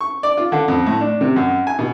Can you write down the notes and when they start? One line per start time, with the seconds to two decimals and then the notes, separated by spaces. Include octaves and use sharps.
0.01 C#6
0.23 D5
0.37 F4
0.52 D3
0.68 F2
0.86 A2
1.01 D4
1.21 C3
1.36 F#2
1.67 G#5
1.79 B2